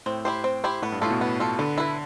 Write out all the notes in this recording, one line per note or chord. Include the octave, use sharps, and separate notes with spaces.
A2 C4
E4 G4 C5
C4
E4 G4 C5
A2 B3
G2
A2 F4 A4
B2
B3
F4 A4
D3 B3
E4 B4